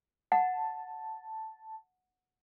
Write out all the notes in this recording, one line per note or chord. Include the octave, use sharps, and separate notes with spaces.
F#5 A5